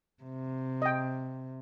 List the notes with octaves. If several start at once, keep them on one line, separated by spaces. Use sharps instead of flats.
C3
D#5 G5